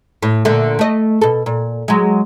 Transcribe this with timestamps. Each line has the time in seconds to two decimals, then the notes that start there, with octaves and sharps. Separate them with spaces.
0.22 A2
0.45 A#2 D3 A3
0.79 A3 D#5
1.21 B2 A4
1.46 A#2
1.88 F#3 G#3